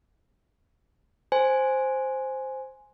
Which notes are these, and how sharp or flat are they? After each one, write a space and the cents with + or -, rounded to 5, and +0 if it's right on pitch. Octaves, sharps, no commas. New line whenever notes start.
C5 +0 G#5 +5